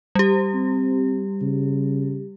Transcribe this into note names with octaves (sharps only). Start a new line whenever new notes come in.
G3 G4
C4
C#3